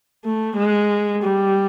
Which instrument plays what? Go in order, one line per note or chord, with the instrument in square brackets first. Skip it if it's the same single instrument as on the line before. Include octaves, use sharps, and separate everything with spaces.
[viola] A3
G#3
G3